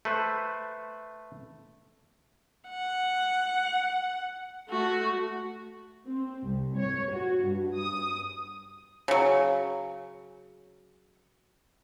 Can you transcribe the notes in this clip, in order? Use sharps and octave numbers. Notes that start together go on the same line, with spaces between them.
A3 B4 C5
F#5
A3 F#4
C4
C2
C#5
F#4
G2
D#6
C#3 F#3